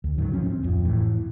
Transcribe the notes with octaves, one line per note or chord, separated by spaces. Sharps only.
D2
C#2 G#2 D#3 F#3
F3 C4 C#4
C4
D1 F2
A2 E3